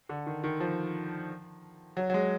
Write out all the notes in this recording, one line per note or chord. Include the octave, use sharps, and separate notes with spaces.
D3
D#3
D#3
F3
F#3
F#3
G#3